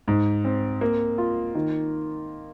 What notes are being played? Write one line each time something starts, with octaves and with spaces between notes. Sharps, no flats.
G#2
C4
A#3
F4
D#3